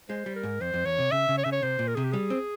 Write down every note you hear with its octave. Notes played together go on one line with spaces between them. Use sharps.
G#3 C5
G3
A#4
G#2
F2 C5
F2
E2 C#5
C3
C#3 E5
C#3
C#5
C#3 E5
C#5
C3 C5
A#2
A#4
C3 G#4
G4
G3 G#4
C4